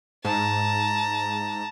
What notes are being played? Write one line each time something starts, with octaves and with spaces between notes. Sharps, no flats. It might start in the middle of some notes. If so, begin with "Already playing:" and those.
G#2 A5 A#5